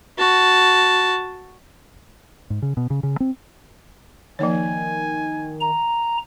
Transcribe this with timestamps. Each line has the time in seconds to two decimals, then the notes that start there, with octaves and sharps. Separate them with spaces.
0.18 F#4 A5
2.50 G#2
2.62 C#3
2.77 B2
2.90 C#3
3.03 C#3
3.20 C4
4.39 D#3 F3 A#3 C#5 G#5
5.61 A#5